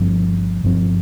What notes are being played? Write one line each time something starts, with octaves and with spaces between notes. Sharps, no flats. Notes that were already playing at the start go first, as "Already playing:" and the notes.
Already playing: G1 G2 F3 C4
G1 G2 F3 C4